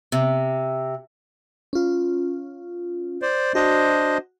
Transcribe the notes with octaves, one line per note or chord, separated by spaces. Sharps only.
C3
C#4 F4
C5 D5
D4 F#4 C5 D#5